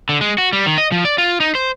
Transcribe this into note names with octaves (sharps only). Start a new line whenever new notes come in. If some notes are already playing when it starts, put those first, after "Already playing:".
D3
G#3
F#4
G3
D#3
D#5
F3
D5
F4
D#4
C5